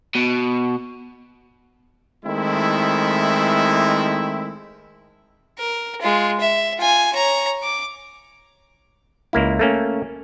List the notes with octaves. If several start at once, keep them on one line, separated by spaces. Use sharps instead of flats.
B2
D#3 G#3 A3 C4 E4
A#4
G#3 F4
E5
F4 G#5
C#5 A#5
D6
C#2 A#3 E4
A3 A#3 C#4